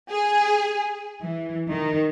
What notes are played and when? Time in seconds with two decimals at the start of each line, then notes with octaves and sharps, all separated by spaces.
0.11 G#4
1.22 E3
1.71 D#3